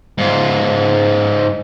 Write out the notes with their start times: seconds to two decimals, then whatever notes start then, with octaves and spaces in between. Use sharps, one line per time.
0.18 G#2 F4